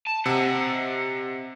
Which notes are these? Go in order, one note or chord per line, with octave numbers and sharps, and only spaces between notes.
A5
C3 D#5 F#5 E6 C#7